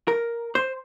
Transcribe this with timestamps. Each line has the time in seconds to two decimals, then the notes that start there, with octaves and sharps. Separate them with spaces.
0.08 A#4
0.55 C5